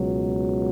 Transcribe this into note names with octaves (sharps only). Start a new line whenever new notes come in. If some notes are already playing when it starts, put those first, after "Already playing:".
Already playing: C#2 B2 F#3